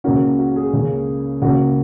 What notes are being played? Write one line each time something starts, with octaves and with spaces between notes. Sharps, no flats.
C#2 C#3 A#3 C#4 F#4 A#4
F#4
G#4
C#2 C#3 A#3 C#4
C#2 C#3 A#3 C#4 F#4